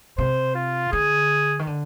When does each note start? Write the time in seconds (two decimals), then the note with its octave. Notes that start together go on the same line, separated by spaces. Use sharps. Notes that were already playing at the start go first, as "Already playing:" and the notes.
0.18 C3 C5
0.55 F4
0.92 D3 G#4
1.59 D#3
1.67 D3